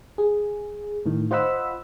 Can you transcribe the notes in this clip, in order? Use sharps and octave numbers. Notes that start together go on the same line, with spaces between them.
G#4
A2 D#3
F4 C5 D#5 F#5 B5 E6